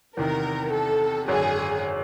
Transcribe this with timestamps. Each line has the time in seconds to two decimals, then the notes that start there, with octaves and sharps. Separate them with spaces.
0.17 E2 C3 D#3 A#4
0.73 A4
1.28 G#1 F#2 D3 G#4